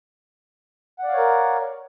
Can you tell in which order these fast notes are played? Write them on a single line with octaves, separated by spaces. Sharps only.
F#5 D5 F5 C#5 A#4